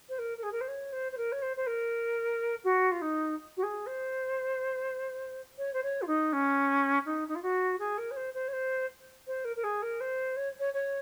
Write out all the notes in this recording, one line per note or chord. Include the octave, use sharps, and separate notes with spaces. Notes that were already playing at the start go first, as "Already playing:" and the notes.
C5
A#4
A#4
G#4
A#4
C5
C#5
C5
C5
A#4
C#5
C5
C5
A#4
F#4
F4
D#4
F#4
G#4
C5
C#5
C5
C#5
F4
D#4
C#4
D#4
D#4
F4
F#4
G#4
A#4
C#5
C5
C5
C#5
C5
C5
A#4
A#4
G#4
A#4
C5
C#5
C#5
C#5